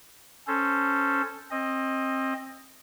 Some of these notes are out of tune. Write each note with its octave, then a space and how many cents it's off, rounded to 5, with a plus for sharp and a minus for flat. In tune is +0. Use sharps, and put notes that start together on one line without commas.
C#4 +0 A4 +0 C5 -5
C4 +25 D#5 +0